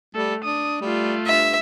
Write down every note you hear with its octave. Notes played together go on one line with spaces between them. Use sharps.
G3 A3 A4
D4 D#6
G3 A3 F4
G2 E5